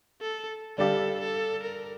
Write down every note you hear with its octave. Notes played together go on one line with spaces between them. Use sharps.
A4
G3 D4 G4 A4 D5 F5
A4
A#4